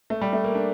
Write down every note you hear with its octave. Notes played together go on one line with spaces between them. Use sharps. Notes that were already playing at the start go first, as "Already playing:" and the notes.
A3
G3
A3
A#3
D4